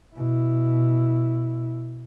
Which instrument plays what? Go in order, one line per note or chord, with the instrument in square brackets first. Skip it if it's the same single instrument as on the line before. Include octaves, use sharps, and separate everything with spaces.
[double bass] B2 E4